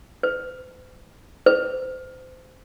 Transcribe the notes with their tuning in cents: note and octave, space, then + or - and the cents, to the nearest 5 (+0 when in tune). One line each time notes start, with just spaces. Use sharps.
C5 -45
C5 -30